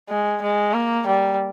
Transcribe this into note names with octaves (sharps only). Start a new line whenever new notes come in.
G#3
G#3
A#3
G3